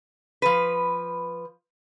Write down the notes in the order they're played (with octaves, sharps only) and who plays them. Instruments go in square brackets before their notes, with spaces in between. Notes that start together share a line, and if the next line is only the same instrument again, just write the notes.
[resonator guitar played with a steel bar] F3 B4